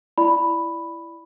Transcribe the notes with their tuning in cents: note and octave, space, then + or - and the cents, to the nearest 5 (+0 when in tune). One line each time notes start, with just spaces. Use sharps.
E4 +15 D5 +0 B5 +0